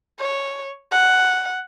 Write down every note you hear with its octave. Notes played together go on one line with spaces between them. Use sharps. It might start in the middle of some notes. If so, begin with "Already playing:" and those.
C#5
F#5